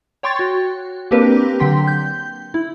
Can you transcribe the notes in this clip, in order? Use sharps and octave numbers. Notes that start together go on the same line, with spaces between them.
C#5 G5 C6 C#6 G#6 A6
F#4
A#3 C4 D4 G4 A#4 B4
D3 F#3 G5 C6 B6
G6
E4